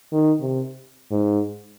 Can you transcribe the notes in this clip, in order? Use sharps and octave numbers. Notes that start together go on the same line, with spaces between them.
D#3
C3
G#2